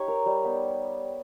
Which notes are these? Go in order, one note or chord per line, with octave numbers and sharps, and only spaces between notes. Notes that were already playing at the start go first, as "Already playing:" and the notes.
Already playing: D#4 G4 C#5
A#4
G3
B3